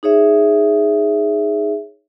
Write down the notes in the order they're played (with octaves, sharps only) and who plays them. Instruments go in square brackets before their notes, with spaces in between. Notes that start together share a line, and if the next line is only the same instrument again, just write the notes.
[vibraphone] D#4 G#4 C#5 E5